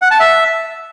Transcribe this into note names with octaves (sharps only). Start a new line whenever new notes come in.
F#5
A5
E5